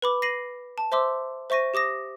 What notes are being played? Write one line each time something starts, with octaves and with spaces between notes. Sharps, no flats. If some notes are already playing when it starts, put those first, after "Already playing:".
B4 B5 D6
A#6 C7 D#7 F#7
A5
C5 E5 C6 D6 E6
C5 E5 C#6 A#6 D#7
G4 D6 D#6 A#6